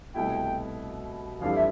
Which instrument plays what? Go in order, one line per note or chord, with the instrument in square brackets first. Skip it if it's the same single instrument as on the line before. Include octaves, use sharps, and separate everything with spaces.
[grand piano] C2 B2 A3 E4 [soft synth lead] G5
[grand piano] F2 E3 G3 D4 A4 [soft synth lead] F5
[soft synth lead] E5